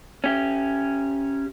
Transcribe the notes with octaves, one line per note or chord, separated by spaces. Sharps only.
C#4 G4